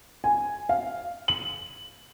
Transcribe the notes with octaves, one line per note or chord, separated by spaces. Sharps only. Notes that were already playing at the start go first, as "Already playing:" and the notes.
G#5
F5
F#7